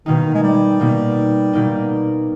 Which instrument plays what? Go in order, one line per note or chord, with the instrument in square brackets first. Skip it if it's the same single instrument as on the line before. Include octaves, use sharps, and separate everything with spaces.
[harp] B2 A#3 D#4 [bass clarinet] D#3
[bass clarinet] G#3
G3
[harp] B2 A#3 D#4
B2 A#3 D#4